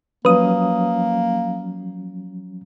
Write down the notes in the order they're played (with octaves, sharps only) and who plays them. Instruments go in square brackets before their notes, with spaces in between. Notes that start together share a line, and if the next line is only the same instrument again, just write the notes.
[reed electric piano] F3 F#3 C#4 [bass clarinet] A#3 [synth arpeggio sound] B4 D#6